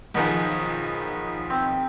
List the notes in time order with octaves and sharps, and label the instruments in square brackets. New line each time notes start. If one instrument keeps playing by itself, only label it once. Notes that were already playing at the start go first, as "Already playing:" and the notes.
[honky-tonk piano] B1 D#3 F3 [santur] B3 D#4 G#4
[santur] C4